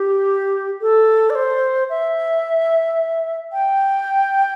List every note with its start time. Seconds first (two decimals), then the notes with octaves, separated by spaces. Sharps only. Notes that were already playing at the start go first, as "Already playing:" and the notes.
Already playing: G4
0.81 A4
1.30 D5
1.35 C5
1.90 E5
3.53 G5